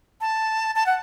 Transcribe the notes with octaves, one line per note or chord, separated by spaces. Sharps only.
A5
A5
F#5